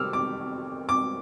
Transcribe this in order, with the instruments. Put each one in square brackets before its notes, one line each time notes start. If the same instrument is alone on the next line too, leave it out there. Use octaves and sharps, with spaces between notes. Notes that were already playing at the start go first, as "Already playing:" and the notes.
Already playing: [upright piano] C3 G3 C4 D6 E6 F6
D6
D6